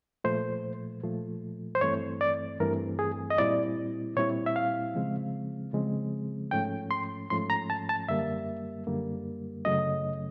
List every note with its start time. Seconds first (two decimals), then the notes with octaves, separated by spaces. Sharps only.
0.24 A#2 F3 A3 C5
1.03 A#2 F3 A3
1.75 C5
1.81 G2 E3 A3 C4 C#5
2.21 D5
2.60 G2 E3 A3 C4 A#4
2.99 G#4
3.30 D#5
3.38 A#2 G3 C4 E4 D5
4.16 A#2 G3 C4 E4 C#5
4.46 E5
4.56 F5
4.95 C#3 F3 G#3 C4
5.73 C#3 F3 G#3 C4
6.51 G#2 F3 A3 C#4 G5
6.91 C6
7.30 G#2 F3 A3 C#4 C6
7.50 A#5
7.70 A5
7.89 A5
8.09 F#2 D3 G3 A#3 E5
8.87 F#2 D3 G3 A#3
9.65 F#2 C#3 F#3 A3 C#4 D#5